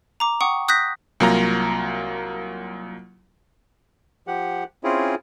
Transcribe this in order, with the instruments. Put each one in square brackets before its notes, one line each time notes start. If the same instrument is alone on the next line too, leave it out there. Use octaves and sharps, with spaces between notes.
[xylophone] A#5 D6
F#5 G5 C#6 D#6
D#6 F#6 G6 A#6 B6
[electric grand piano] C2 F#3 A#3 F4 A#5
[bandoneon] F3 G4 F#5
C4 C#4 E4 F4 G#4